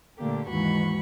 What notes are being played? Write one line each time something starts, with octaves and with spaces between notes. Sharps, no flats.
A#2 D3 A3 A#3 G4
D#2 G#2 E3 F#4 B5 C#6